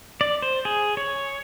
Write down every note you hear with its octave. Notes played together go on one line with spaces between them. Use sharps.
D5
C5
G#4
C#5